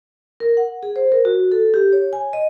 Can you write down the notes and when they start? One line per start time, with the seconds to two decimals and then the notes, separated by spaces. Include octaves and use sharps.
0.40 A#4
0.57 F#5
0.83 G#4
0.96 C5
1.12 A#4
1.25 F#4
1.52 A4
1.74 G4
1.93 C#5
2.13 G#5
2.33 D#5